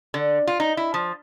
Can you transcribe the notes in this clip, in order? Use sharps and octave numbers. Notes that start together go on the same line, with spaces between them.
D3
F4
D#4
E4
F3